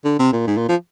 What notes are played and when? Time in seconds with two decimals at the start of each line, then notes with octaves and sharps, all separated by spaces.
0.05 D3
0.19 C3
0.33 A#2
0.47 G#2
0.57 A#2
0.69 F3